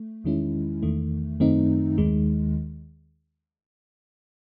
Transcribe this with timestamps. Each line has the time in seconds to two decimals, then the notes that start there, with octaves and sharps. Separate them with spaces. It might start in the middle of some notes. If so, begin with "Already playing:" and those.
Already playing: A3
0.24 E2 D#3 G#3 C#4 E4
0.83 E2 D#3 A3
1.40 F#2 D#3 A3 C4 D#4
1.98 D#2 D#3 G#3